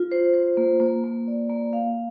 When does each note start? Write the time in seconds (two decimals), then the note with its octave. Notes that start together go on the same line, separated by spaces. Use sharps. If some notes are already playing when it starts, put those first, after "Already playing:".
Already playing: F4
0.12 C5
0.34 C5
0.57 A#3
0.80 A#3
1.04 A#3
1.27 D5
1.50 A#3
1.73 F5